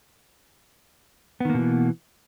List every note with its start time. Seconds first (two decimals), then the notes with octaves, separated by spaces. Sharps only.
1.40 B3
1.45 D#3
1.50 A#3
1.54 B2
1.59 E3